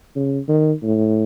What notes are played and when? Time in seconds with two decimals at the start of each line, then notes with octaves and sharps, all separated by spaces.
0.15 C#3
0.49 D#3
0.83 A2